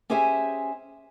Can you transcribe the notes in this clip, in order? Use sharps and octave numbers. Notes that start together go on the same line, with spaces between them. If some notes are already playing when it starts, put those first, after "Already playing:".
C#4 G4 G#4 C5 E5 G#5